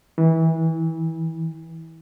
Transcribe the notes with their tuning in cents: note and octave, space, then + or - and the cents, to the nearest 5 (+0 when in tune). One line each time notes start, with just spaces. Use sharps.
E3 -25